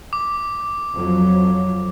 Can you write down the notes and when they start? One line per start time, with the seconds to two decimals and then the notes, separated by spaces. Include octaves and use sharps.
0.13 D6
0.94 F2 F3 F#3